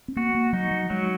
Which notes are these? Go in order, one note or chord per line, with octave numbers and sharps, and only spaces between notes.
C4
A#3 F#4
A#3
F#3 D#4
F#3
F#3 G#3